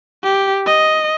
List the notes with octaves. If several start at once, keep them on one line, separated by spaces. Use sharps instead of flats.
G4
D#5